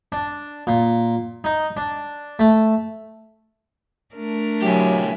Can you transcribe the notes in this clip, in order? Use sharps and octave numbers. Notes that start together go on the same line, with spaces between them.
D4
A#2
D#4
D4
A3
A3 D4 A#4
B1 F#3 G4 E5 G#5